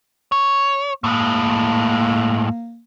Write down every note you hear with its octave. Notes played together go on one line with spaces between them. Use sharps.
C#5
A2 G#3 A#3